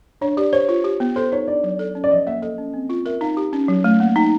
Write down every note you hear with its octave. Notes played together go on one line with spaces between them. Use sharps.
D4 C#5
G4 D5
C5 C#5
F4
G4
B3
A4 C5
D#4 C#5
D4 D5
F#3
A4
C#4
D5
F3 D#5
A#3 E5
A4 D#5
C#4
C4
F4
A#4 E5
D#4 F5
G4
C#4
F#3
A3
A#3 F#5
D#4 G5